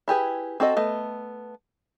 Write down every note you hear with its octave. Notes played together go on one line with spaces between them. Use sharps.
E4 G4 G#4 B4
C4 F#4 A4 D#5
A3 B3 D#5